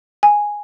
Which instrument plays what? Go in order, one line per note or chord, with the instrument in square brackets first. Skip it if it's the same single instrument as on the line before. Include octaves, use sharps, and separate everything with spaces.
[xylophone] G#5